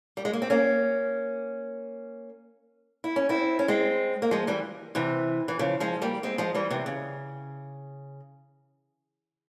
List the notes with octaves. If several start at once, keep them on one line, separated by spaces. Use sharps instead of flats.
G3
G#3
A#3
C4
A#3 C#4
E4
C#4
C4 E4
C#4
G#3 C4
A#3
F3 G#3
E3 G3
C3 E3
E3
C#3 F3
F3 G#3
G3 A#3
G#3 C4
F3 G#3
E3 G3
C3 E3
C#3